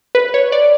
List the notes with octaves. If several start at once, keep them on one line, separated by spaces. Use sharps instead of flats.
B4
C#5
D5